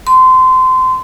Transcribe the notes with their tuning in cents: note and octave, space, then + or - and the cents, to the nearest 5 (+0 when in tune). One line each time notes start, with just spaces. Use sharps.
C6 -25